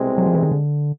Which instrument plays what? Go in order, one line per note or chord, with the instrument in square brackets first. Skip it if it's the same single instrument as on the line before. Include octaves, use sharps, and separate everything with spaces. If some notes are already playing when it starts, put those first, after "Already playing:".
Already playing: [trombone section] C2 B2 G#3 C4
[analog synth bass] F#3
F3
E3
D#3
D3